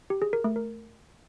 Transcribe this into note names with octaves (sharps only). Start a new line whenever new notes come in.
G4
G#4
A#4
A3
A#4